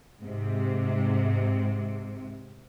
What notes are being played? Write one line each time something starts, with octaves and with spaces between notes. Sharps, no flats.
G#2 C3